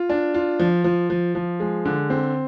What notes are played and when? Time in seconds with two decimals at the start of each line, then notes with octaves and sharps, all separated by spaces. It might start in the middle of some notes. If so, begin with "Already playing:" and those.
Already playing: F4
0.10 D4
0.34 F4
0.59 F3
0.84 F3
1.10 F3
1.35 F3
1.60 G#3
1.85 D3
2.10 C4